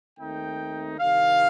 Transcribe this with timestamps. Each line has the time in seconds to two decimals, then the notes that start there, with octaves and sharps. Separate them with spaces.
0.19 D#2 D#3 A3 C4 D#4 G5
0.99 C2 C3 D#3 F5